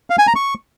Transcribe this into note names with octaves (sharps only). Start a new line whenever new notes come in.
F5
G#5
A#5
C#6